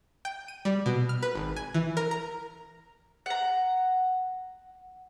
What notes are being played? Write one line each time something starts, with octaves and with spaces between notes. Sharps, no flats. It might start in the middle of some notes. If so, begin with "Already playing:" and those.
G5
D#7
G3
B2
F6
B4
G#1
G#5
E3
A#4
A#5
F#5 A#5